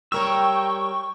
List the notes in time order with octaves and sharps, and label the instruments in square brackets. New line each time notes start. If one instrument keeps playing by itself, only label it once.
[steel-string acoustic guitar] G3 A#4 C#5 [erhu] G5 [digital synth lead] C#6 [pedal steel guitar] E6